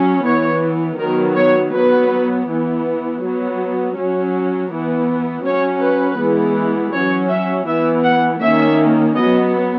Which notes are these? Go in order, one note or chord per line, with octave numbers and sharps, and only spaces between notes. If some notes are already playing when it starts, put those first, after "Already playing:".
Already playing: F#3 C#4
E3 B3 C#5
D#3 F#3 B3 A#4
C#5
F#3 B3 B4
E3 B3
F#3 B3
F#3 C#4
E3 B3
F#3 C#4 C#5
B4
E3 G#3 B3
F#3 C#4 C#5
E5
E3 B3 E5
F#5
D#3 A#3 C#4 E5
F#3 B3 D#5